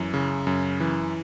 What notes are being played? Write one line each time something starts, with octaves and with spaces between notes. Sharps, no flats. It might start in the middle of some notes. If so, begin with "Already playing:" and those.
Already playing: F#2 E3
C#3
F#2
E3